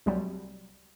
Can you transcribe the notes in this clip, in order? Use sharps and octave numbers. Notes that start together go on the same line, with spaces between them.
C2 F#3 G3